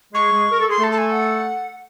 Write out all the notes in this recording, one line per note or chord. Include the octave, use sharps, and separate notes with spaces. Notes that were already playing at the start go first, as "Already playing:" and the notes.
G#3 G#4 C#6
G#3 G#4
A#4
A4
G#4 C6
A3 A4 A5
A5
G#5
F#5